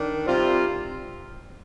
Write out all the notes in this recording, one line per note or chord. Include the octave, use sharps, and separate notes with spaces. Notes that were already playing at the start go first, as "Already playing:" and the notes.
Already playing: D#3 D4
C3 G3 C4 F4